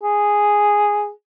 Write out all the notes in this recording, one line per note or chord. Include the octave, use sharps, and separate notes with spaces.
G#4